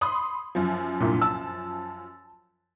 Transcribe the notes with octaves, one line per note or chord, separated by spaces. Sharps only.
B5 C6 D#6
F#2 F3
C2 G2 A#2
A5 E6